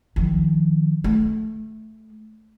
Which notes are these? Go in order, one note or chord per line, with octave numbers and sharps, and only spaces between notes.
D#3 F3
A3